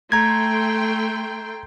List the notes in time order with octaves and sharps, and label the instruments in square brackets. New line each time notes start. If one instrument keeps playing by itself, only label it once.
[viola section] A3 G5 C6 [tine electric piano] A#5 G#6